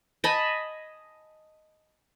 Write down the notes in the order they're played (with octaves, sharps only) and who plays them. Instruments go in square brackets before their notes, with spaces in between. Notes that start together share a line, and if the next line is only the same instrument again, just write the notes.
[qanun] D#5 G#5 A5 B5